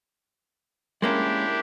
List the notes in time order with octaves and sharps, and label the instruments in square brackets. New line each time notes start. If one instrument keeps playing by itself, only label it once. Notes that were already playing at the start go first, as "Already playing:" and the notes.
[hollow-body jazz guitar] G#3 A#3 C#4 [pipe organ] D4 E4 G4